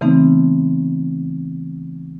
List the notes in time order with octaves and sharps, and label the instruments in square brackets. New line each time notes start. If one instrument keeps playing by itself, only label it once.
[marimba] C#3 E3 A3 B3 C4 D#4